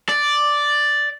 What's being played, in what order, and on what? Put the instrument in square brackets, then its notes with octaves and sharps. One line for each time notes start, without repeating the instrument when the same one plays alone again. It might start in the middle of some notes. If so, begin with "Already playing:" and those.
[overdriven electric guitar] D5